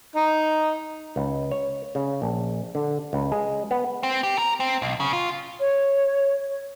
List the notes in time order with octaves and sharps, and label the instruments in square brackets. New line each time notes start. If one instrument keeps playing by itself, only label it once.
[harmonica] D#4
[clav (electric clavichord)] C#2
C#5
C#3
A#1
D3
C#2
G#3
B3
[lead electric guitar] C4
G4
A#4
C4
B1
C#3
F4
[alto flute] C#5